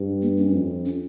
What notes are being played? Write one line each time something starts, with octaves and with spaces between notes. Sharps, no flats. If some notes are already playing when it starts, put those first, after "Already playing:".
Already playing: G2
A#3
C#4
F2
C#4